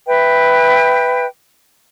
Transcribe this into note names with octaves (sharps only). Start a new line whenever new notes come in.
B4 E5 G5